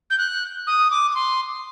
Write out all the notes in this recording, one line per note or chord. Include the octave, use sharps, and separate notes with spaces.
G6
F#6
D#6
D6
D6
C6